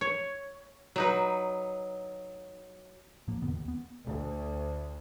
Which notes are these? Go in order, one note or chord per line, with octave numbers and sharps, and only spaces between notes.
C#5
F#3 D#4 B4
A2 F3 A#3
F1 D3 B3
D#2
B3
D2